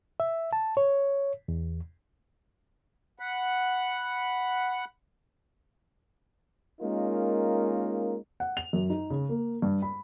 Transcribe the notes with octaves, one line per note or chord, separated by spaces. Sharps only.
E5
A5
C#5
E2
F#5 B5
G#3 A#3 C#4 D#4 F4 A#4
F#5
F7
F#2
D#4
C#3
A#3
G2
B5